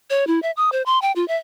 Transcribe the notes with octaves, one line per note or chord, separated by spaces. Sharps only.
C#5
E4
E5
D#6
C5
C6
G5
F4
E5